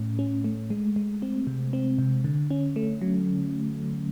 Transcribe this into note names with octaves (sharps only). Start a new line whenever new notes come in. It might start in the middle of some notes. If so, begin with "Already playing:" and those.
Already playing: A2 A3 C#4
C#4
A3
G#3
G#3
C4
C3
C4
C3
D3
C#4
A3
F#3